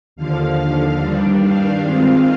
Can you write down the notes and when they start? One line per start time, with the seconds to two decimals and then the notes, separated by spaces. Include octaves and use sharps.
0.16 D#2 D3 F3 F5
1.00 G2 D#3 G3 D4
1.41 F5
1.83 D#3 G#3 C4 F4 F5